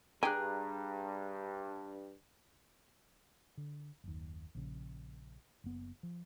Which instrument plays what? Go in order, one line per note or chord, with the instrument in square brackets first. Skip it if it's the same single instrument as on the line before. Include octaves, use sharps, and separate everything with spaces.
[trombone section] G2 [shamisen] G4 [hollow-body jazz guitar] G#4 G#5 [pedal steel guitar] A#5 F#6
[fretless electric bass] D3
F#1 D#2
A#1 C#3
F#1 B3
F3